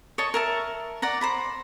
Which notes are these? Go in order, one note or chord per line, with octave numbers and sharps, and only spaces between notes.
C#5 D#5 A5 C#6
A#4 E5 A5
D5 F#5 A#5
C5 A#5 B5